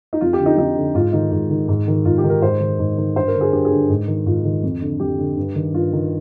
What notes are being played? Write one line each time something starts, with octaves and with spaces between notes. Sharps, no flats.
D#4
F2 F4
G4
D3
D#4
F2 D#4
D3
G#2 F4
D#3 D#4
G#2
D#3
G#2
D#3
G#2 F4
G4
D#3
A#4
G#2 C5
D#3
G#2
D#3
G2 C5
A#4
D3
G#4
G2 G4
G#4
D3
G#2
D#3
G#2 F4
D#3
F2
D3
F2 G4
D3
G2
D#3
G2 F4
D#3